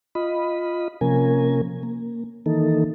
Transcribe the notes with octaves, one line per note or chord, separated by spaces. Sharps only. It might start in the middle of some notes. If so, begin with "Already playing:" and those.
F4 D#5 B5
C3 F3 A#3 C#4 A#4 G#5
A#3
D#3 E3 A#3 D#4 A4